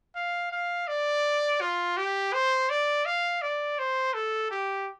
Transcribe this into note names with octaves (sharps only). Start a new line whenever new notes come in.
F5
F5
D5
F4
G4
C5
D5
F5
D5
C5
A4
G4